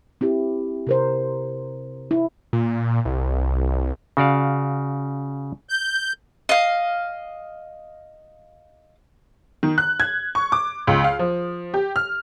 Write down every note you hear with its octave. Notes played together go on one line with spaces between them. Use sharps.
C4 E4 G4
C3 A#4 C5
E4
A#2
C2
C#3 F#4 D5 F5
G6
D#5 F5
D#3
F#6
G#6
C#6
D6
C#2
F5
F3
G4
F6